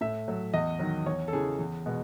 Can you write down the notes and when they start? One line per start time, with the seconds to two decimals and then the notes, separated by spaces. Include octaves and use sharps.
0.01 A2 E5
0.28 F#3 A3
0.54 E2 D#5
0.79 D#3 F#3
1.06 E2 C#5
1.28 A4
1.33 C#3 E3 G#4
1.59 E2
1.86 B2 G#3 B3